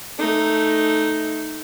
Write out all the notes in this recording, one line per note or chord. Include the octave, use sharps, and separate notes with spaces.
A3 D#4